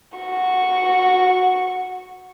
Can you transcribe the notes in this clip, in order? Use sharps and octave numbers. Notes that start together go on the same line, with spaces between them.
F#4 C#6